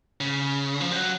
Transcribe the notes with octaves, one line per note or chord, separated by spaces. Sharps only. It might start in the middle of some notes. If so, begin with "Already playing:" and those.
C#3
F3
G3
F#3